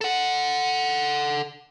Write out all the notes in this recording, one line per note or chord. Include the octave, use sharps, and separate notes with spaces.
A4 F#5